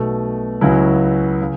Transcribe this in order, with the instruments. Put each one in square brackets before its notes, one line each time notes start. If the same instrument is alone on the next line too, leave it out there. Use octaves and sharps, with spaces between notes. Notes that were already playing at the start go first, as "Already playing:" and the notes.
Already playing: [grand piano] B1 B2 A3
C#2 C#3 F#3 C#4 E4
C#3